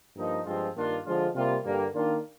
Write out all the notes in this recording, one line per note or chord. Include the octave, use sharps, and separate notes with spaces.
G2 F3 A#3 D#4
G2 F3 G#3 C4 F4
G2 D#3 A#3 D4 F4
D3 F3 G#3 D4 F4
C3 G3 A#3 F4
G2 D3 G3 A#3
D#3 A#3 D4 F4